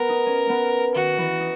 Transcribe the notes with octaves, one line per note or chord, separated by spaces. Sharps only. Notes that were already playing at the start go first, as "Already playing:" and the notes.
Already playing: B3 A#4
D#4
C#4
B3
D#3 F#4
E3
D#4